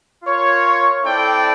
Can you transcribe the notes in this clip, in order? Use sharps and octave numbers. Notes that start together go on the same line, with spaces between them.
F4 A#4 C#5
C4 E4 A4 D5 G5